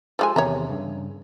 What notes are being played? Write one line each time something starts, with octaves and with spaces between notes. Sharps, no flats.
F3 G#3 G4 A4 G#5 E6
E2 C3 D#3 C#5 E5 A#5
G2 C#3